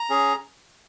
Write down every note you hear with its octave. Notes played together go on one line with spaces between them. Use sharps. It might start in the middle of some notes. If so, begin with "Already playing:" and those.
Already playing: A#5
C#4 G#4